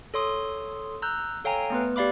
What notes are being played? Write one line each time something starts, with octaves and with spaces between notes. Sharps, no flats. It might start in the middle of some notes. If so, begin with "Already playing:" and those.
A4 C#5 C6 D#6
A#5 E6 F#6 G6
A4 C#5 F5 G5 G#5 A#5
A3 B3 B4
G4 D5 F5 B5 D6